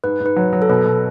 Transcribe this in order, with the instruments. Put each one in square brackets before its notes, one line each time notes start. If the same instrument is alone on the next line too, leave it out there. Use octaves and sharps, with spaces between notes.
[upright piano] G#2 [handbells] B4
[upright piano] G#2
[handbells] B4
[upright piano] F#3
F#3
[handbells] A4
[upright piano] B2 [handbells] B4
[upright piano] B2